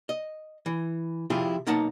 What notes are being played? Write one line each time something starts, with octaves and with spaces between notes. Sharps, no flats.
D#5
E3
C3 F3 E4 F4 G4 G#4
B1 A#3 D#4 F#5 A5